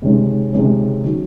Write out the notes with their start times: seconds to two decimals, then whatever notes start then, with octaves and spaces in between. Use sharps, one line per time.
0.02 C#2 C3 D#3 G#3 C#4
0.52 C#2 C3 D#3 G#3 C#4
1.03 D#3 F#3